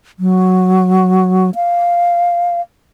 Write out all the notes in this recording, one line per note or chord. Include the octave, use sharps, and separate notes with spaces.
F#3
F5